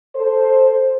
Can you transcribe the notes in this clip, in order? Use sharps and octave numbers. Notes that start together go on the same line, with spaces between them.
A4 C5